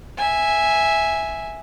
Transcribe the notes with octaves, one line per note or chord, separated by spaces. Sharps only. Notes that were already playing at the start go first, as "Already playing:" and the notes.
E5 G#5